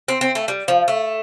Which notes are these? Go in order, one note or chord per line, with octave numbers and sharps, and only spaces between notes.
C4
C4
A3
G3
F3
A3